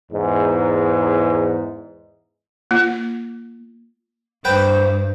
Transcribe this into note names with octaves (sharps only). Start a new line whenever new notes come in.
E2 G#2
A#3 F4
G2 B4 C5 G5